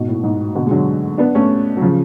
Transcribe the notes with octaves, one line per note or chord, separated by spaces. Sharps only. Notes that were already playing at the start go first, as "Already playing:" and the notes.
Already playing: G#2 B2
A2
G#2
B2 D3
G#3
D3 F#3
B3 D4
A3 C#4
F#3
C#3 F3